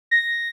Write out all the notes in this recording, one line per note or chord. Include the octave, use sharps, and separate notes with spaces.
A#6